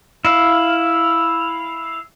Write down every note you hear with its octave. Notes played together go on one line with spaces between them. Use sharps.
E4 F5